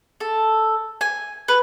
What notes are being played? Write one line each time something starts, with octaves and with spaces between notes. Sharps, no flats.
A4
G#5
B4